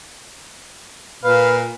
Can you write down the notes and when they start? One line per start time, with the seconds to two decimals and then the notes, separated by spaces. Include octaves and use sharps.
1.24 A#2 B4 F5